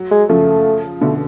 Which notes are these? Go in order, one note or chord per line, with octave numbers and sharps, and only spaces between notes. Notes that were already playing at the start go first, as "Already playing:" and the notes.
Already playing: F#3
G#3
C#3 F3 A3
B2 D3 A3